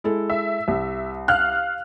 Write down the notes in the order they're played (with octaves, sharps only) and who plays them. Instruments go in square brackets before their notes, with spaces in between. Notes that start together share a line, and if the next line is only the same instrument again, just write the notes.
[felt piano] G#3 E4 A4
[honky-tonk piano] E5
[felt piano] C2
[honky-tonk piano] F5 F6 F#6